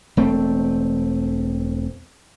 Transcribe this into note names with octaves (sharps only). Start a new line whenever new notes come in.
E1 A3 C4